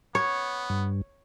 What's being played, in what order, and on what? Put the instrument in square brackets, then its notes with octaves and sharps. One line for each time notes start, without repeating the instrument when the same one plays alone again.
[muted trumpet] B3 [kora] C#5
[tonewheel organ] G2